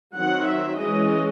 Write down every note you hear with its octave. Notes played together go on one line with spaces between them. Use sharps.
D#3 F#3 C4 F#5
E5
E3 G#3 C#4 D#5